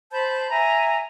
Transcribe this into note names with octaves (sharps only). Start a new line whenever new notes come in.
C5 A5 B5 G6
E5 G#5 A#5